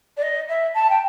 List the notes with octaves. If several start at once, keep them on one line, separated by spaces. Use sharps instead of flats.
D5
D#5
E5
A5
G5